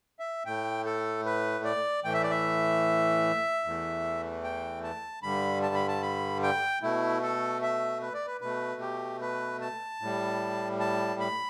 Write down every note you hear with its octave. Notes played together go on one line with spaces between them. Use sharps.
E5
A2 A3 G5
A4
B4
D5
A2 E3 A3 G5
E5
D5
E5
E2 E3 A3
G5
A5
G2 D3 G3 B5
A5
B5
A5
B5
G5
B2 A3 E4
A4
E5
B4
D5
B4
B2 A3 B4
G4
B4
A5
A2 G3
A5
B5